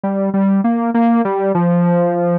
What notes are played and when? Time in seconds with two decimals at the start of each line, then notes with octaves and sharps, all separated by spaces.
0.03 G3
0.34 G3
0.64 A#3
0.94 A#3
1.25 G3
1.55 F3